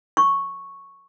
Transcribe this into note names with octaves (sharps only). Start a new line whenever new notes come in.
C#6